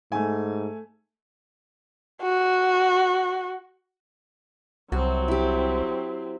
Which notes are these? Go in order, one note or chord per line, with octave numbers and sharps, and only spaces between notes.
G#2 A3 G#5
F#4
C2 F#3 C4 F#4
E4 G4